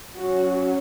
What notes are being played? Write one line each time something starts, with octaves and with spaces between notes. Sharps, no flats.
F#3 C#4 F#4